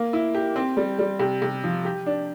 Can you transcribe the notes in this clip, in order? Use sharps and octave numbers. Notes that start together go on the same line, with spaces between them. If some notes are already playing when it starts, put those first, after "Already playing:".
Already playing: A#3
E4
G4
C4
G3
G3
C3
C3
F3
G4
D4